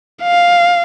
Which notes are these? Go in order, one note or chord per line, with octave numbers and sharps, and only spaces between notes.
F5